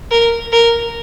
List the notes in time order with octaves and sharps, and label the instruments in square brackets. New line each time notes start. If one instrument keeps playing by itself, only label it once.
[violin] A#4
A#4